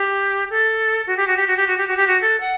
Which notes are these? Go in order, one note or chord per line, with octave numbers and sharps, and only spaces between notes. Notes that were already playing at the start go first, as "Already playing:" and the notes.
Already playing: G4
A4
F#4
G4
F#4
G4
F#4
G4
F#4
G4
F#4
G4
F#4
A4
F#5